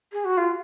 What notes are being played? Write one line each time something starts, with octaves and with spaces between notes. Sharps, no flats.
G#4
F#4
F4